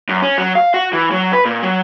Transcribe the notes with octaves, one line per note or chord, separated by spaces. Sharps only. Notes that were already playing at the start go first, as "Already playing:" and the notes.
F#2
C#4
F#3
F5
F#4
E3
F#3
B4
A#2
F#3